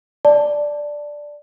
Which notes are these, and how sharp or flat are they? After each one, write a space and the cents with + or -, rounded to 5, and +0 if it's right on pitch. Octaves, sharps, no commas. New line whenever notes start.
D5 +0 A5 +0